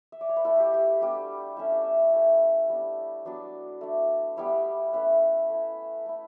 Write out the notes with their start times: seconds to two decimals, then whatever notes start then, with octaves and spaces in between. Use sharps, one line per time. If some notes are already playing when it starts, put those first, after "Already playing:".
0.12 E5
0.21 D5
0.29 C#5
0.37 B4
0.45 A3 E4 A4
0.60 G4
0.74 G4
1.01 G3 B3 D4 G4
1.57 A3 C#4 E4 E5
1.70 D5
1.84 E5
2.13 A3 C#4 E4
2.69 G3 B3 D4
3.25 F#3 B3 D4 D5
3.81 A3 D4
4.37 G3 B3 E4 C#5
4.93 A3 C#4 E4 B4
5.50 A3 E4
6.06 A3 E4